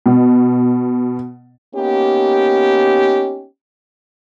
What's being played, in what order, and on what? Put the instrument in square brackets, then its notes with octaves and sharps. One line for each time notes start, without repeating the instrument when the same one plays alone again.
[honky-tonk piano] B2
[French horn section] A#3 B3 C#4 D#4 G4